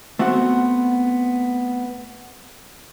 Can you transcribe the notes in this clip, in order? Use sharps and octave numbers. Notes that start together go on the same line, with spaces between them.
A3 B3 C4 F#4 F#5